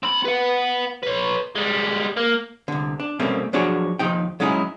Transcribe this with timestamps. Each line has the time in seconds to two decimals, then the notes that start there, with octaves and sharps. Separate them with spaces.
0.03 C4 B5
0.25 B4 F#5
1.03 B4 C#5
1.56 G3 G#3
2.17 A#3
2.68 C2 D3
3.00 D4
3.20 B2 G3 A3 A#3 C4 C#4
3.53 F3 F#3 D4 F#4 G#4 C#5
3.99 D#2 F3 D#4 G5
4.40 F#3 G#3 C#4 D#4 E4 G#4